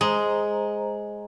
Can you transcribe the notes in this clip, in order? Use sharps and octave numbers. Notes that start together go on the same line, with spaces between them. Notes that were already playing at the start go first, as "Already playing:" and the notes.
G#3 C5 A#5